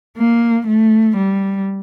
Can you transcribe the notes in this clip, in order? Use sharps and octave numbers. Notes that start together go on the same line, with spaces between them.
A#3
A3
G3